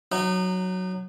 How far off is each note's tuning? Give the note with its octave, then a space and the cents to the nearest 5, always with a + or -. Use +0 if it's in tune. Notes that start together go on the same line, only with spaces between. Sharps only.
F#3 +0 D#4 -30